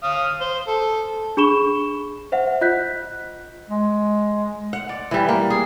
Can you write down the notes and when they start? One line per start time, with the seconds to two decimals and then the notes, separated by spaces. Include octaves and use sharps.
0.03 F5 D#6
0.41 C5
0.68 A4
1.37 D4 G#4 B5 C#6 E7 G7
2.32 C5 E5 F#5
2.61 F4 D#5 F#6 G6 B6
3.70 G#3
4.73 F#5
4.89 D5
5.11 E3 G3
5.29 A#3
5.50 G#4